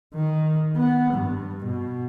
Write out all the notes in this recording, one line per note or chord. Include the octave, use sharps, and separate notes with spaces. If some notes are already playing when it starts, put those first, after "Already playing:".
D#3
B3
G2
B2